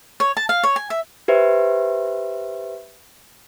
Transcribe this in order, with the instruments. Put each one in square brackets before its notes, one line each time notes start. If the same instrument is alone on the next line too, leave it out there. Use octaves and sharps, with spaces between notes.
[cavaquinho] C#5
A5
F5
C#5
G#5
E5
[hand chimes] G4 B4 C5 E5